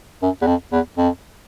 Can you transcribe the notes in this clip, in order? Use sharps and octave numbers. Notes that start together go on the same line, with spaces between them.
F#2
E2
F2
E2
F2